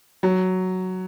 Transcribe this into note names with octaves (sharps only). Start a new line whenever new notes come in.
F#3